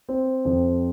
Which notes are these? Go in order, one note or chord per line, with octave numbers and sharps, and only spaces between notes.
C4
F2